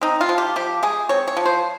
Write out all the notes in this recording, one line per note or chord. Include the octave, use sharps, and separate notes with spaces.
C4 D#4
F4
F3
G4
F3 G4
G#3 G#4
C4 C#5
C#5
F3
C5